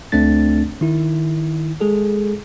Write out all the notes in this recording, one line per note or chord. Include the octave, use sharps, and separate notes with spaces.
D2 A3 C4 D4 A6
D#3 E4
G#3 G#4 A4